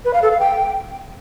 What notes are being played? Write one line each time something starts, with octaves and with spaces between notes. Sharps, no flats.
B4
F5
A4
F5
G5